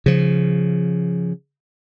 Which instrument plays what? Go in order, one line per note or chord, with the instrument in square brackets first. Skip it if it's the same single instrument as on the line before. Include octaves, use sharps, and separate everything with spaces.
[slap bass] C#3 F3